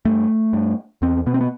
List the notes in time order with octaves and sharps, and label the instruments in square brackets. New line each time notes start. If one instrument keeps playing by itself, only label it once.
[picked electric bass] G2 A3
G2
E2 C4
B2 B3
C4
B3